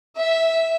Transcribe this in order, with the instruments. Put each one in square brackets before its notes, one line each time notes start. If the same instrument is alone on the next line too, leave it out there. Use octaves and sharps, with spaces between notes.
[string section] E5